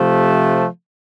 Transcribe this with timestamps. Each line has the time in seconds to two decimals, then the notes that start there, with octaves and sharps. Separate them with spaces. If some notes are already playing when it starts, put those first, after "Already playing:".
Already playing: C3 F3 A3